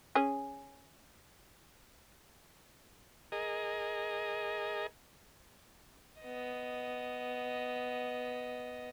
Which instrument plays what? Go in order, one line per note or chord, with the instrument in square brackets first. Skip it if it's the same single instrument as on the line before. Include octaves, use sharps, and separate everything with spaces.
[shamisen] C#4 G#4
[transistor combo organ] G#4 A#4 D#5
[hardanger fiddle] B3 D#5